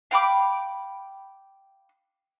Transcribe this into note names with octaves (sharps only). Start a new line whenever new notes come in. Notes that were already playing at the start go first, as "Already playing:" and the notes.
F5 G5 B5 D6